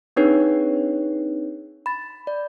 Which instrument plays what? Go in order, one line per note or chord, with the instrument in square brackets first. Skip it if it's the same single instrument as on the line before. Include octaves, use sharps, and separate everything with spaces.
[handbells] C4 D4 D#4 G#4 B4 C#5
B5 A6
D5